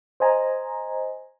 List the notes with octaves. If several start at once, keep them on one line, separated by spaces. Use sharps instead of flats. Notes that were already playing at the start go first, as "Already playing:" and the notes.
C5 D#5 G#5 A#5